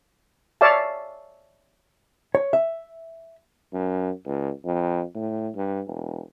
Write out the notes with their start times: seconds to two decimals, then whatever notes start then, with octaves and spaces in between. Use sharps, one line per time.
0.61 C#5 D5 E5 F5 A5
2.35 C#5
2.53 E5
3.73 F#2
4.26 C#2
4.65 F2
5.15 A2
5.55 G2
5.87 E1